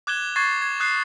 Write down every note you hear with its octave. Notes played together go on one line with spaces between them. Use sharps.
D6 F#6 G#6 E7 G7
C#6 D6 F#6 G#6 A6 C7
G#6
D#6 F#6 C7